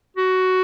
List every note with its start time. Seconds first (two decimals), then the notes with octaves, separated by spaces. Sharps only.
0.17 F#4